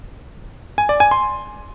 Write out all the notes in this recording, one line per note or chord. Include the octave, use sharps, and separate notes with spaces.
G#5
D5
G#5
C6